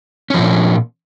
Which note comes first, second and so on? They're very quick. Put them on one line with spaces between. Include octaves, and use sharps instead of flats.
C#4 F3 A#2